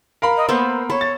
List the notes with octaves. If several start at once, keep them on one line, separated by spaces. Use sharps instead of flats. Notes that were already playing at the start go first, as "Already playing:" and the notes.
A#4 F5 B5
D#5
A#3 B3 A4 C5
A4 C#5 B5
A6